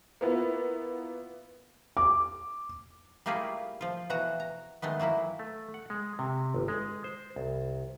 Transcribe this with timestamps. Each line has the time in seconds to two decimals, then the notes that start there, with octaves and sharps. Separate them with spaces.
0.21 A#3 B3 E4 F4
1.97 D6
3.26 G3 A3 A#3 E4 F4 G#4
3.81 F3 F4
4.10 B2 E3 F#4 A#5
4.40 A#5
4.82 D#3 G#3 A3 B3
4.99 E3 F#3 A#3 E4
5.39 A3
5.74 F#5
5.90 G#3
6.19 C3
6.54 G1
6.68 G#3
7.04 C5
7.36 C2